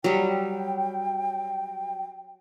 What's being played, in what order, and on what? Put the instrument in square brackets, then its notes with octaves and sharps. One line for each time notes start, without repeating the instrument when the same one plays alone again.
[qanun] F#3 G3 [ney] G5